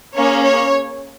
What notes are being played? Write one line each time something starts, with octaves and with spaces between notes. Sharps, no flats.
A#3 C#4 G#4 C#5
C#5